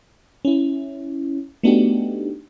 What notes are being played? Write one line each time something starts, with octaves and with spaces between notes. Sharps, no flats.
C#4 E4
A3 B3 D4 D#4 F#4 G4